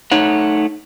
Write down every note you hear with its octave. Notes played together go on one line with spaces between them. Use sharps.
A3 D#4 C#5 F#5